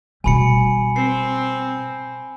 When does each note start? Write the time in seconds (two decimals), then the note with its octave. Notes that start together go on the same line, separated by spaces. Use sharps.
0.24 B2 G3 G#5 B5 C#7
0.96 C4 C7